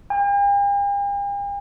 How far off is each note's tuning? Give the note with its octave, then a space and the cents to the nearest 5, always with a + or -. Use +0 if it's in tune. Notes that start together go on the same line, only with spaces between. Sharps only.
G5 +45